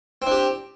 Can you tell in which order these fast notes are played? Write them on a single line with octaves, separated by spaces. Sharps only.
C4 D4 G4